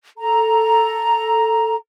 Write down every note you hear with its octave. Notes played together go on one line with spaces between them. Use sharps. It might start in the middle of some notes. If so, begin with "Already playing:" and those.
A4 A#5